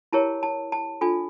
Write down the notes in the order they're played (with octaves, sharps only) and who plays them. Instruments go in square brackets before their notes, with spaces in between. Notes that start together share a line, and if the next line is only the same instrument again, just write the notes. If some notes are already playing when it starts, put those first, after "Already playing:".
[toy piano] E4 G4 A#4 C#5 A5
A5
A5
D4 F4 A4 G#5